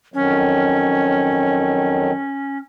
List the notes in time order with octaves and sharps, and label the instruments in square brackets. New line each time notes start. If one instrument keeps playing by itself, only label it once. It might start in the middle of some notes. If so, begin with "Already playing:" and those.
[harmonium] F2 D#3 F#3 [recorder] C#4